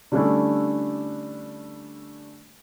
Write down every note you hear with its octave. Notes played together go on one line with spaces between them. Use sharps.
D3 G3 A3 C#4 D4 E4